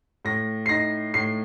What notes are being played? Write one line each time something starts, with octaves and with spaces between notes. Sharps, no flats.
A2 A#6
C7
D#4 A#6
A2 C7